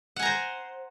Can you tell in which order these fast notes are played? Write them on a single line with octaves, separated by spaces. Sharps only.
F#5 G#5 A#5 C5